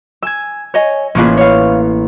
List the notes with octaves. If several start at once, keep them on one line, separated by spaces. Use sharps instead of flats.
G#5 E6 G#6
C#5 D#5 G#5
A1 A#3 C#4 F4 G#4 B4
C#5 F5